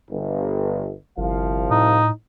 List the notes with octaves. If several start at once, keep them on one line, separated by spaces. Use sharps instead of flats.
G1
G1 C2 F3 F5
A2 D#4